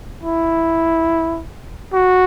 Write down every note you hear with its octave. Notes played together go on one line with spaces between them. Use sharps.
E4
F#4